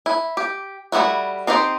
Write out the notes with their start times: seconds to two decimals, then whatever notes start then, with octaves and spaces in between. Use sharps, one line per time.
0.06 E4
0.37 G4
0.92 G3 A3 B3 E4 F#4
1.47 C4 D#4 G4 C5